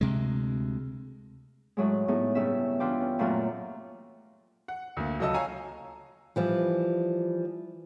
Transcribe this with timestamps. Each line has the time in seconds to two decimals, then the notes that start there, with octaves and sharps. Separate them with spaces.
0.01 D2 C3 G#3
1.77 A2 F#3 G#3
2.08 A2 B3 D#4 G#4
2.35 G2 C#3 C#4 E5
2.80 E3 D4 F4 B4 G5 D6
3.00 C#4
3.19 F#2 A#2 F#3 A3 F#4 A#4
4.68 F#5
4.97 D2 A#3
5.19 C#2 F#3 A4 D#5 A5 E6
5.34 C#5 F5 G#5 A#5
6.36 E3 F3 G3